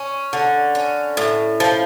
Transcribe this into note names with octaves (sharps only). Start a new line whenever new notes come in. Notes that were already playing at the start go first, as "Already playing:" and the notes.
Already playing: C#4
D3
C#4
A2
F3